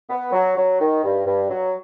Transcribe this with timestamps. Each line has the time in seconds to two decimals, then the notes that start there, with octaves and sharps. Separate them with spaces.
0.10 B3
0.32 F#3
0.57 F#3
0.80 D#3
1.04 G2
1.26 G2
1.50 F#3